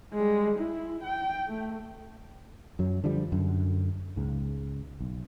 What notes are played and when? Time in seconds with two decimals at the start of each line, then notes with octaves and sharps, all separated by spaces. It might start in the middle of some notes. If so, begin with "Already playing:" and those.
0.14 G3 G#3
0.60 E4
1.04 G5
1.48 A3
2.79 F#2 F#3
3.04 D3 F3 G3
3.32 F#2 D3
4.16 C#2 G#2
5.00 B1